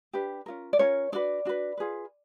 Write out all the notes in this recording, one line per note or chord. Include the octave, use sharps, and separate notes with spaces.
D4 G4 B4
C#4 F4 A#4
D5
C#4 F4 A#4 C#5
D4 F#4 B4 D5
D4 F#4 B4
F4 G#4 B4